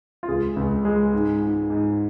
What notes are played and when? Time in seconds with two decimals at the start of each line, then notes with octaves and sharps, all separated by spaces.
0.23 F4
0.29 C#2 G#4
0.57 C#2
0.85 G#3
1.13 G#2
1.42 G#2
1.70 G#2